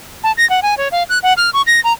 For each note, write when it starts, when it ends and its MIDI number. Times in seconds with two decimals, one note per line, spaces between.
0.24 0.32 81
0.37 0.48 94
0.50 0.60 78
0.62 0.77 80
0.77 0.88 73
0.92 1.03 77
1.09 1.19 90
1.23 1.33 78
1.37 1.50 89
1.54 1.62 85
1.67 1.80 94
1.84 1.93 82